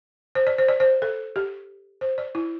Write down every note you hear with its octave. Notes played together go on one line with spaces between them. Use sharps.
C5
D5
C5
D5
C5
A4
G4
C5
D5
E4